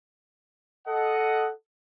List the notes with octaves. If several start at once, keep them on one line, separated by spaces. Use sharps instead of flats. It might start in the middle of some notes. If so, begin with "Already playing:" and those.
A4 D#5 F#5